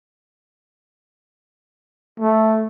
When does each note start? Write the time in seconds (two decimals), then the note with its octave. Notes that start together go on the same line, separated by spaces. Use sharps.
2.20 A3